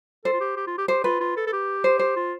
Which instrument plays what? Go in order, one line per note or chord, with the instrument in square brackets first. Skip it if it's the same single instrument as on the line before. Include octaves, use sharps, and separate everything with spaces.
[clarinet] A4 [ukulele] C5
[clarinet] F4
G4
G4
F4
G4
[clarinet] G4 [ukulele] C5
[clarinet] F4 [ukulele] B4
[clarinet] F4
A4
A4
G4
[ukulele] C5
C5
[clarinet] F4